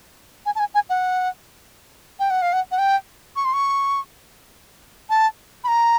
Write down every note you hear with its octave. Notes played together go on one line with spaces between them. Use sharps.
G#5
A5
G#5
G#5
F#5
G5
F#5
F5
F#5
F#5
G5
C#6
C6
C#6
A5
B5
A#5